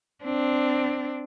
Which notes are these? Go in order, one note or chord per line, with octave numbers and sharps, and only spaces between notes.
C4 D4